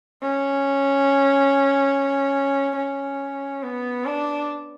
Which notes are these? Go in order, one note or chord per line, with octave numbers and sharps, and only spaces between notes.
C#4
C#4
B3
D4